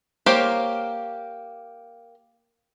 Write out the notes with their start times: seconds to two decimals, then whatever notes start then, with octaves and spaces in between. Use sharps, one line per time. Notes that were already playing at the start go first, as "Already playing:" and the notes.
0.26 A#3 G4 C5 C#5 F5